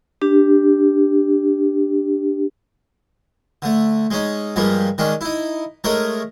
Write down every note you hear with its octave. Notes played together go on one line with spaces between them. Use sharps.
D4 G4
D3 A3
G#3 C#4 D#4
G2 F3 G3 G#3 A#3
D#3 G#3 C#4 D4
D#4 E4
G#3 A3 D#4 A#4 C#5